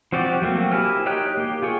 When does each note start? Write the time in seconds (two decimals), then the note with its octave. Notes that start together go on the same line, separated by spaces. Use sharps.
0.12 F3 C4 F#4 G4 D5
0.42 F#3 A3 A#3 C4
0.72 A#3 E4 G4 G#5 F6
1.06 D#4 G4 C#5 G5 F#6
1.37 A#3 G4
1.62 F4 G#4 C#5